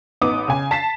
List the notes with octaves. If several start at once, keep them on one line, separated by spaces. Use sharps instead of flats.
A1 B3 D#4 D6 D#6
C#3 G#5
A5 B6 C7 E7